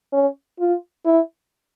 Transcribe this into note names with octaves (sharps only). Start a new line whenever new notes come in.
C#4
F4
E4